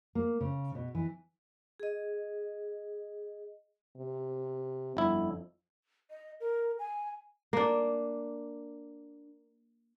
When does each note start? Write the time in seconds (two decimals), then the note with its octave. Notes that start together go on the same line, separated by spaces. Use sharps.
0.15 A#3
0.41 C#3
0.75 B2
0.95 E3
1.80 G#4 D#5
3.97 C3
4.97 G1 F2 E4
6.10 D#5
6.40 A#4
6.79 G#5
7.53 A#3 D4